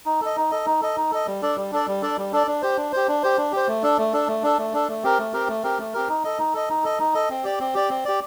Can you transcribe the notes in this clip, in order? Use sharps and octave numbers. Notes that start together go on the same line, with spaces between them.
D#4
A4 D#5
D#4
A4 D#5
D#4
A4 D#5
D#4
A4 D#5
G3
D4 A4 D5
G3
D4 A4 D5
G3
D4 A4 D5
G3
D4 A4 D5
D4
G4 C5
D4
G4 C5
D4
G4 C5
D4
G4 C5
A3
D4 A4
A3
D4 A4
A3
D4 A4
A3
D4 A4
A3
C4 G4 A#4
A3
C4 G4 A#4
A3
C4 G4 A#4
A3
C4 G4 A#4
D#4
A4 D#5
D#4
A4 D#5
D#4
A4 D#5
D#4
A4 D#5
C4
G4 D5
C4
G4 D5
C4
G4 D5